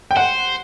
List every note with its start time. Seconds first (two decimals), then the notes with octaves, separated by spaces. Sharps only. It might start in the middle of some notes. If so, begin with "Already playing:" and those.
0.11 G5
0.16 C5 F#5